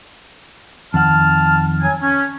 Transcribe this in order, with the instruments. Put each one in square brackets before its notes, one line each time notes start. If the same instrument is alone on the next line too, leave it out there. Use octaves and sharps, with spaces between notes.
[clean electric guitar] F2 D#3 F#5 [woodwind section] A5 F6
[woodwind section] F#3 G#5
C#4